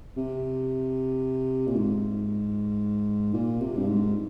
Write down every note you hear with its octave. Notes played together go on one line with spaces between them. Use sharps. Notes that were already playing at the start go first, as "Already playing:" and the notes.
C3
A#2
G#2
A#2
C3
G2
G#2